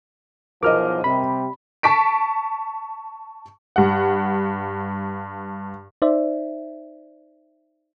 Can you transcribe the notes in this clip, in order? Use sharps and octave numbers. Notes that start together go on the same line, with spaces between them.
B1 E2 F3 A#4 D#5 D6 F6
C3 G3 B5
A5 C#6 B6 D7
G2 F#5
D#4 C5 D5 E5